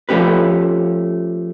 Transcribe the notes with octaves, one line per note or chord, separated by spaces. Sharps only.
F3 A3 C#4 G4 B4